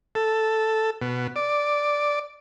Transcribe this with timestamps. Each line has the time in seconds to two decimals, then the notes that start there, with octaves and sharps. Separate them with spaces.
0.15 A4
1.02 B2
1.36 D5